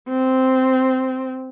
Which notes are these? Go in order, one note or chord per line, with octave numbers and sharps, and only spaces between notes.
C4